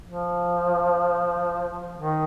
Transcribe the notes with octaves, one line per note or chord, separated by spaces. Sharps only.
F3
D#3